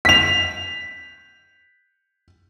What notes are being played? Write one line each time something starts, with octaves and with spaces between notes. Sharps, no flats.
B6 F7